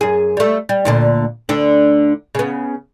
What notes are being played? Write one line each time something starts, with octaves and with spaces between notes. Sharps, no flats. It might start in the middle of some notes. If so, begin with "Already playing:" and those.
F#2 G#4
G3 A3
G3
D2 A#2 D3
D2 D3 D4
C#3 B3